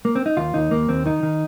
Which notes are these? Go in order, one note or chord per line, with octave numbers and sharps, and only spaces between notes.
A#3
C4
D#4
D#2 F4
D#2 D#4
D#2 A#3
D#2 C4
D#3 D#4
D#3